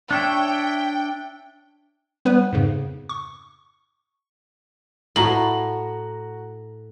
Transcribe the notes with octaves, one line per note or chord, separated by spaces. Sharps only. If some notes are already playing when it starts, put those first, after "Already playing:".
D4 C#5 E5 G5
G3 B3 B4
F2 G#2 C#3
C#6
A2 F#4 A#5 F#7